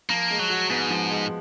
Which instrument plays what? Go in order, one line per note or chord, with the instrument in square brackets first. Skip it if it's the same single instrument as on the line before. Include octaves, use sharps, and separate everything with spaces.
[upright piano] F3 [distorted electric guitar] A#3
[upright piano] G#3
[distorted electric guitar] F#3
[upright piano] F#4
[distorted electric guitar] G#2 [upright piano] B3
[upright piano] F3
G#3